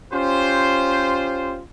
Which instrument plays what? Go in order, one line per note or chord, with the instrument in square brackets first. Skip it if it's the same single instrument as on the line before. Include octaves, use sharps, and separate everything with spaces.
[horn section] C#4 F4 G4 C5